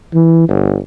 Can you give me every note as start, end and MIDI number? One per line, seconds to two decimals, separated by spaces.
0.14 0.47 52
0.49 0.76 31